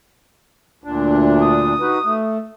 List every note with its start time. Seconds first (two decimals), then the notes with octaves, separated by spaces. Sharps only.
0.84 D2 A#2 D4
1.42 D#6
1.80 D#4 F#4 B4
2.04 A3